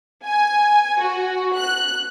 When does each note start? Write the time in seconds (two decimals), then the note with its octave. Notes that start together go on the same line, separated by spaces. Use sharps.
0.25 G#5
1.00 F#4
1.58 F#6